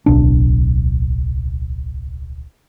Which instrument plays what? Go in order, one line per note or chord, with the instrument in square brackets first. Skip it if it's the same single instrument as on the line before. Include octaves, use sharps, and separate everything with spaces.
[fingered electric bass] D1 B1 D4